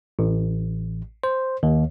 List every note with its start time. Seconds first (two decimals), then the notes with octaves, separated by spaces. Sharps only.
0.19 A1
1.24 C5
1.63 D#2